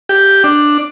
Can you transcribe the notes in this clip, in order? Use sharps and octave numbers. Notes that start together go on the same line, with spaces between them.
G4
D4